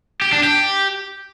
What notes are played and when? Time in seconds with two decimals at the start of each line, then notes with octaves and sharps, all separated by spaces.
0.22 G4
0.32 D4
0.43 G4